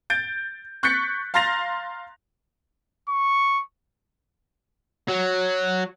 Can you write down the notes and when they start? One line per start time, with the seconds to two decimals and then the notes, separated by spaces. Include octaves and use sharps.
0.10 G6 A6 D7
0.83 C#6 F#6 G6 A6 B6 C#7
1.34 F5 A#5 C6 A6 A#6 F7
3.09 C#6
5.08 F#3